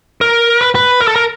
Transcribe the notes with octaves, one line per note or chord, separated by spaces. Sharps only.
A#4
B4
B4
A#4
A4
A#4